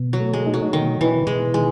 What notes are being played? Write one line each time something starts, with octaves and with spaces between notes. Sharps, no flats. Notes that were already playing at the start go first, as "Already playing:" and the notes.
Already playing: B2
F#3
A3
G#3
D#4
F#3
B2 D#3
B2 E3
B2 G#3
D#3 G#3